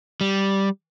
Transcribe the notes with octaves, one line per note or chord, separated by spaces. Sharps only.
G3